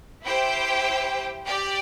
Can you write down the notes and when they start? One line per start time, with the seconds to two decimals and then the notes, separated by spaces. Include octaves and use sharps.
0.24 E4 G4 C5 G5
1.46 G4 D5 G5